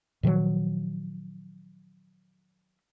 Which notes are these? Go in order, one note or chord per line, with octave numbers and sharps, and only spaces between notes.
A#2 D#3 F3 F#3